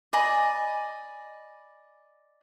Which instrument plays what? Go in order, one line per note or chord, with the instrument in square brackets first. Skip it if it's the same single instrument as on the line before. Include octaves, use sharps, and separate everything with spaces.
[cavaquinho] D5 D#5 G#5 B5